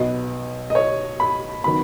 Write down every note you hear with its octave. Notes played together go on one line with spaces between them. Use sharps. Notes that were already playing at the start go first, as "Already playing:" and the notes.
Already playing: B1 B2 B3 D#5
D#5
C#5
B5
D#3 F#3 B3 B5